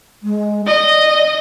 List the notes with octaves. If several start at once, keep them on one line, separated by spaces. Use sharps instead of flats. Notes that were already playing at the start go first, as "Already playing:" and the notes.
G#3
D5 D#5